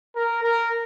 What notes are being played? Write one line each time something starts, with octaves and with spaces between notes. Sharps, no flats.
A#4
A#4